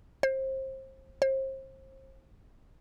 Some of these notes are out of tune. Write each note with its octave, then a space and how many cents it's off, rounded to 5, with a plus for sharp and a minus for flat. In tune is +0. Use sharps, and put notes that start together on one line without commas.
C5 +30
C5 +35